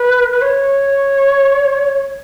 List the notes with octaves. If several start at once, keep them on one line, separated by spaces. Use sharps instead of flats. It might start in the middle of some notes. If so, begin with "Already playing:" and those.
Already playing: B4
B4
C#5